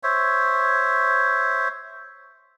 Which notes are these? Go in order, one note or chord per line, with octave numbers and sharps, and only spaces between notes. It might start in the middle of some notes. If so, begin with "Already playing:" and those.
C5 C#5 E5